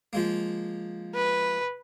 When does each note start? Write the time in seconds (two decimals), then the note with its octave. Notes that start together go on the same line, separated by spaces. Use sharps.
0.13 F3 G#3 A#3
1.15 B4